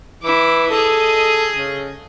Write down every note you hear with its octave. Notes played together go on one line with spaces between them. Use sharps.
E3 E4 D6
G#4 A4 D#5
C#3